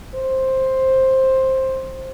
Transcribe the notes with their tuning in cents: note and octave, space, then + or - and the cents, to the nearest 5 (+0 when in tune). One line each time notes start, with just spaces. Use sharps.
C5 +10